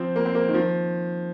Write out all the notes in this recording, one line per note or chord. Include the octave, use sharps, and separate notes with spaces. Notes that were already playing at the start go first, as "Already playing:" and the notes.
Already playing: F3 C4
A#3
C4
A#3
D#3
F3